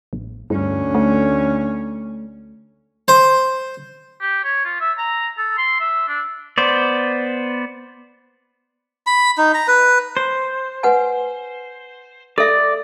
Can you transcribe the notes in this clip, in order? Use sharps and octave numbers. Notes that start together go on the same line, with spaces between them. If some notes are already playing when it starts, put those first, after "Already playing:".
A1
D2 G2 C#4
A3
C5
G4
C#5
F4
E5
A#5
A4
C6
E5
D4
B3 C5 D5
B5
D#4
A#5
B4
C5
B4 F#5 G#5
A4 D5 E5